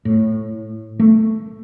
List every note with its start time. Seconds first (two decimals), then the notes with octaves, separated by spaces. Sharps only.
0.05 A2
0.99 A3